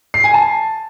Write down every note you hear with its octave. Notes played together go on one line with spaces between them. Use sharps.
C7
G#5
A5